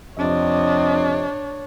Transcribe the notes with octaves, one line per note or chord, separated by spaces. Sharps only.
F2 C3 D4 C#5 D#5